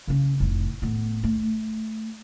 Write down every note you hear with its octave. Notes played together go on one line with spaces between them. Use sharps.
C#3 C#4
F1 A2
A2 B3
A3